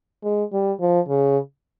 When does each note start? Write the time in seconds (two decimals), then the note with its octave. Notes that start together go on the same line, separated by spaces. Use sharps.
0.24 G#3
0.53 G3
0.80 F3
1.08 C#3